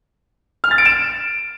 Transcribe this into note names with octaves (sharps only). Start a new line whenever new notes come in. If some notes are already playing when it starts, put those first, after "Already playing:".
F6
A6
D7
E7